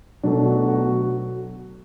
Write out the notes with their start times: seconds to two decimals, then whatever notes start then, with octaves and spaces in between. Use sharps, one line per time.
0.23 B2 F#3 A3 D4
0.46 F#4
0.68 F#4